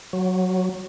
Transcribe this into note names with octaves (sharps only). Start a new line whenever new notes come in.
F#3